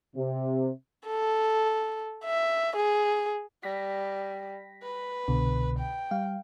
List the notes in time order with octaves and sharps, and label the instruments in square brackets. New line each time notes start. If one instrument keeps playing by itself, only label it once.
[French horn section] C3
[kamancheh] A4
E5
G#4
[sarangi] G3 [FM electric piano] A#6 B6
[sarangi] B4
[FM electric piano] C2 B2 D3
[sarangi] G5
[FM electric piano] G3 F5